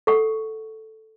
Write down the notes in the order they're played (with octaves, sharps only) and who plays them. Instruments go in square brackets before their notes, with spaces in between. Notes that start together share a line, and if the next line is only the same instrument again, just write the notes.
[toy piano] A4 F#5 C#6